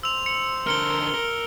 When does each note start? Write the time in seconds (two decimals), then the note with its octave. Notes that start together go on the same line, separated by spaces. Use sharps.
0.03 C5 E6 F7
0.26 C#7
0.67 D3 A#4 F6 C#7 G7
1.14 A#4